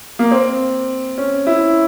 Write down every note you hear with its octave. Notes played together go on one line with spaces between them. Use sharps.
A#3
C4
C#4
E4